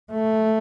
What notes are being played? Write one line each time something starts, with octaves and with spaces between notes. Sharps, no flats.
A3